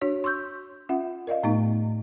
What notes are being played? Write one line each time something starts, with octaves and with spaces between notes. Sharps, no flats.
D4 F#4 C#5
C6 C#6 E6 G6
C#4 F4 E5 F#5
A#4 D5 D#5 F5
A2 A3 B3 D#4